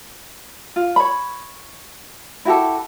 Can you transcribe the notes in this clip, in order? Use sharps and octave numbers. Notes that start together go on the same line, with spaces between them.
F4
C#5 B5
E4 F#4 G4 A4